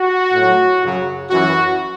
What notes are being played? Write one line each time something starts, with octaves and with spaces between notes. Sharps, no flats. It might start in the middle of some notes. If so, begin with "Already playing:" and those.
Already playing: F#4
A2 F#3
F#2 C#3 F#3
F#2 E3 F#4